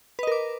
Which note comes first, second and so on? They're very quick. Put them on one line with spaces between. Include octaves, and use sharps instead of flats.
B4 D#5 A#4 D6